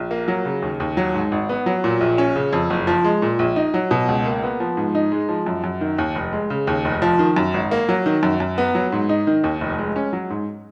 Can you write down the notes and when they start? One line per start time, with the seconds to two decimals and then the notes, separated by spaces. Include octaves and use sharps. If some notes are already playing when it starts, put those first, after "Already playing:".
Already playing: A#1
0.11 A#3
0.28 F#3
0.45 C#3
0.62 D#2
0.80 D#2
0.97 F#3
1.14 G#2
1.32 G#1
1.49 B3
1.66 F#3
1.84 A#2
2.01 A#1
2.18 C#4
2.36 C#3
2.53 F2
2.70 F#1
2.87 F3
3.04 G#3
3.22 A#2
3.39 A#1
3.56 D#4
3.74 F#3
3.91 B2
4.09 C#2
4.26 A#3
4.43 B3
4.60 F3
4.77 G#2
4.95 D#4
5.12 G#3
5.29 F3
5.46 F#2
5.64 F#2
5.81 D#3
5.98 D#2
6.15 F1
6.33 G#3
6.50 C#3
6.67 D#2
6.85 F1
7.02 F3
7.19 D#3
7.36 F#2
7.54 G#1
7.71 A#3
7.89 F#3
8.06 D#3
8.23 F#2
8.40 F#2
8.58 B3
8.75 F#3
8.92 G#2
9.09 D#4
9.27 D#3
9.44 D#2
9.61 F1
9.79 G#3
9.96 C#4
10.13 F#3
10.30 G#2